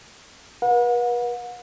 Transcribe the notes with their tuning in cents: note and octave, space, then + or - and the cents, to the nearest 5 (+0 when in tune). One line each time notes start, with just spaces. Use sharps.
B4 -40 F#5 -40